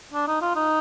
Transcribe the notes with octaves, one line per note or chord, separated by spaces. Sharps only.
D4
D#4
F4
D#4